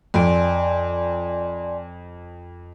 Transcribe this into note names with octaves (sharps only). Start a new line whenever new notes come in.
F2 D5 G#5 C6